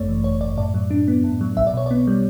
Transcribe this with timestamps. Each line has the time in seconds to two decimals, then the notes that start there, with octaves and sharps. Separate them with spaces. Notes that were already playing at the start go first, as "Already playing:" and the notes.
Already playing: G1 F#2 A3 C#5 D5
0.08 E3
0.24 G1 C#5
0.41 F#2 D5
0.57 A2 D5
0.74 F#3
0.91 D4
1.08 B3
1.24 A2
1.41 F#3
1.57 B1 E5
1.67 D5
1.74 B2 C#5
1.86 B3 D5
2.07 G3